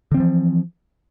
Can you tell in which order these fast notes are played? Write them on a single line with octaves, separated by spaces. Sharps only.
D3 C4 E3 F3